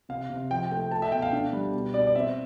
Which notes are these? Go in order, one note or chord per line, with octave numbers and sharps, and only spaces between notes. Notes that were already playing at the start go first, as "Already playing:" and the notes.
C3 F5
C3
F3 G5
A3 G5
A3 A5
E5
B2 G5
F5
D4
G3
B2
B2 D5
D5
C4 E5